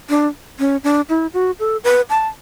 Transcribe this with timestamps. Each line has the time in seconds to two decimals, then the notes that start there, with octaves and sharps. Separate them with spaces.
0.09 D4
0.59 C#4
0.84 D4
1.09 E4
1.34 F#4
1.60 A4
1.84 B4
2.10 A5